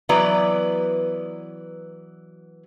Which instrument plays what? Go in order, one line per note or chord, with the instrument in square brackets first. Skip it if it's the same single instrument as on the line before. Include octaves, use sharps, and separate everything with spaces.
[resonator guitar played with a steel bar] E3 F#3 B3 B4 D5